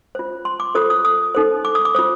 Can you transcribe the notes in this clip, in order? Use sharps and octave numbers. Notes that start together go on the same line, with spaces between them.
F4 C5
C6
D6
F4 A4 C5 D#6
D#6
D#6
D#4 A4 C5
D6
D#6
D6
F4 C5 D#6